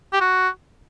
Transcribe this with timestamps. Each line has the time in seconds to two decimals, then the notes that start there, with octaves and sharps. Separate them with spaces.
0.13 G4
0.21 F#4